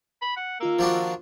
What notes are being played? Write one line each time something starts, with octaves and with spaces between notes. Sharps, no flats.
B5
F#5
D#3 A#3 F4 E6
F3 D4 F#4